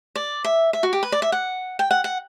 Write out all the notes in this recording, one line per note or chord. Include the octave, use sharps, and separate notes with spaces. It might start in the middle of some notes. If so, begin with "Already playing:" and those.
D5
E5
E5
F#4
G4
B4
D5
E5
F#5
G5
F#5
F#5